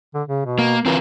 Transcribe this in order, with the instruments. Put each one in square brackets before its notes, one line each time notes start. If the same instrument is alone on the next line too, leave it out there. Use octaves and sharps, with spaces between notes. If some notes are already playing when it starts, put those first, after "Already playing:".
[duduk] D3
C#3
B2
[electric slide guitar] A#3
[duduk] E3 [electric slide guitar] C4 F4 A#4